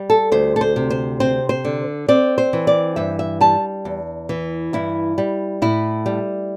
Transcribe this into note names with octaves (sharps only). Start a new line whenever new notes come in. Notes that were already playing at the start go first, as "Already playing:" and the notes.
Already playing: G3
A4
D2 C5
A4
C5
C3
C5
C4 C5
C5
D3
C4 D5
C5
E3
D5
G2 E5
E5
G3 A5
E2
E3
G2 E4
G3
A2 E4
G3